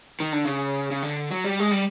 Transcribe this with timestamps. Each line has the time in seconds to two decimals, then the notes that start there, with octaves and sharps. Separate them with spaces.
0.20 D#3
0.33 D3
0.45 C#3
0.91 C#3
1.02 D3
1.31 F#3
1.44 G3
1.60 G#3
1.71 G3